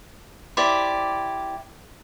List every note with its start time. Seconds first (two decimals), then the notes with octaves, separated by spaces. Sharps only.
0.57 E4 G4 C5 D5